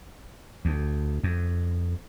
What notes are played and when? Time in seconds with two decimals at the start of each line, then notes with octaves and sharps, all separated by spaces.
0.65 D2
1.23 F2